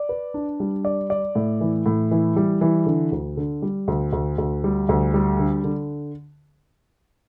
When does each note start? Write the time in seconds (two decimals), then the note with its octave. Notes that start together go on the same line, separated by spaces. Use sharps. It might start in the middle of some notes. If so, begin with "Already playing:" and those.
Already playing: D5
0.09 B4
0.34 D4
0.60 G3
0.85 D5
1.10 D5
1.35 A2
1.61 E3
1.86 A2
2.11 E3
2.36 G3
2.61 E3
2.86 D3
3.12 D2
3.37 D3
3.62 G3
3.88 D2
4.13 D2
4.38 D2
4.64 G3
4.89 D2
5.14 G3
5.39 D3
5.64 D3